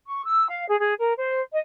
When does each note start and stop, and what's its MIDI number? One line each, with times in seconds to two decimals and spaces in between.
0.07 0.24 85
0.25 0.44 88
0.48 0.64 77
0.68 0.79 68
0.79 0.94 68
0.99 1.12 70
1.17 1.40 72
1.51 1.58 75